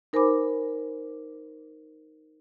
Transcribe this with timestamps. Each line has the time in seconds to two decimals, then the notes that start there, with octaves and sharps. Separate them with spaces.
0.13 D#4 A#4 C5 G#5 B5 D6